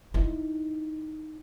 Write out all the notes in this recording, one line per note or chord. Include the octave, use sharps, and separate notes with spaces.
D#4 E4